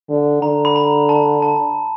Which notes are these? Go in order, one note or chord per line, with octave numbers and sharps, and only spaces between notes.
D3
D3 A#5
B5
A#5
A5
A5